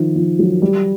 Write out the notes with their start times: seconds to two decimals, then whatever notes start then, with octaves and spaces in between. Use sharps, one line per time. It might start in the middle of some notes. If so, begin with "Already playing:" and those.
Already playing: D#3 F3
0.15 F3
0.39 F#3
0.62 G3